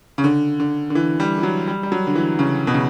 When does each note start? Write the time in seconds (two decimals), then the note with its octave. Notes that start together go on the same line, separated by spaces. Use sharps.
0.18 C#3
0.24 D3
0.60 D3
0.90 D3
0.95 E3
1.20 G3
1.38 E3
1.43 F#3
1.68 G3
1.83 G3
1.92 F#3
2.07 D3
2.15 E3
2.39 C#3
2.67 B2
2.74 C#3